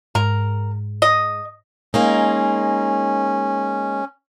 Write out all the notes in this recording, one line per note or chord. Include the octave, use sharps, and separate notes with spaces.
G#2 A#4
D#5
G#3 A#3 C#4 D#4